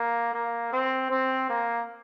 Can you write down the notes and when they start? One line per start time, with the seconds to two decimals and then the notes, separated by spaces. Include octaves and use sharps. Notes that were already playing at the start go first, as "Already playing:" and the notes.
Already playing: A#3
0.33 A#3
0.72 C4
1.10 C4
1.49 A#3